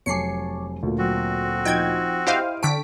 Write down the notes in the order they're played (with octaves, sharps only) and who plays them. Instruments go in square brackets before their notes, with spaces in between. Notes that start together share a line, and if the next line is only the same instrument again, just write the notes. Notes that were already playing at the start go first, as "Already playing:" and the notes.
[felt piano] F1 F#3 G#5 [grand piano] C#5 A5 D6 [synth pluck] C7 C#7
[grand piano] D2 A#2
[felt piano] F#3 [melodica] C4 F#4
[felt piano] F3 D#4 D#5 [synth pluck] G5 G#6
[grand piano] E4 D#5 D#7 [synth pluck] G4 C5 F5 [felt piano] D7
[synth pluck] D3 B6 D7 [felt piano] G5 A5 C#6